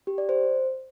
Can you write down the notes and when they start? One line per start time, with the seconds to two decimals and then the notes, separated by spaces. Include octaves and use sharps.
0.07 G4
0.18 D5
0.29 C5